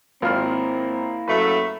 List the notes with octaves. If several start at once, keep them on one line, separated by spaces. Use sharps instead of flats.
G#1 A#3 C4 E4 F4 F6
F#2 C#3 F#3 A3 B4